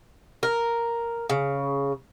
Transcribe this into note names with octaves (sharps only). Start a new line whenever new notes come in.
A#4
C#3